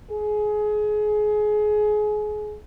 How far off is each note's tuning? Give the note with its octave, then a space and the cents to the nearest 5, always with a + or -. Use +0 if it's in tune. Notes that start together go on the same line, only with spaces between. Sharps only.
G#4 +25